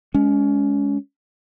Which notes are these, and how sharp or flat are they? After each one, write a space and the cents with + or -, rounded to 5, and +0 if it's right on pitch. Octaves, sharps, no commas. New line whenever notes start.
G#3 +0 C#4 +25